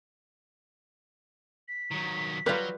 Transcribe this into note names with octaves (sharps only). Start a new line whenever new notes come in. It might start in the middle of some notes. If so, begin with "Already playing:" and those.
B6
D#3 F#3
F#3 G3 F4 B4